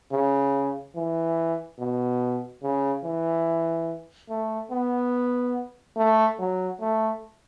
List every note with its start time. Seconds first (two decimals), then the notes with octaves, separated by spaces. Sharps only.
0.12 C#3
0.96 E3
1.79 B2
2.63 C#3
3.04 E3
4.30 A3
4.71 B3
5.97 A3
6.39 F#3
6.80 A3